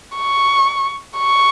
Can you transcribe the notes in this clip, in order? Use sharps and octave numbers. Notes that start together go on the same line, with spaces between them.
C#6
C#6